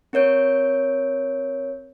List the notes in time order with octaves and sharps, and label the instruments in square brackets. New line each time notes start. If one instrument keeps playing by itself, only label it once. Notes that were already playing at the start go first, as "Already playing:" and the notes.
[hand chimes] C4 A#4 C#5 G6 D7